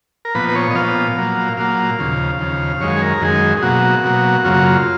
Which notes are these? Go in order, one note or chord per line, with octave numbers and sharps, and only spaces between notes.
A#4
A#2 F3 B3 B4
B4
C#5
D#5
A#2 F3 B3 F5
A#2 F#3 A#3
A#2 F#3 A#3 F5
D#2 C#3 F3
D#2 C#3 F3
F#2 D#3 G#3 C#5
G#4
A#4
F#2 D#3 G#3 G#4
G#4
B2 F#3 A#3 F#4
B2 F#3 A#3
F#2 C#3 F#3 A#3 F4
F#4
F4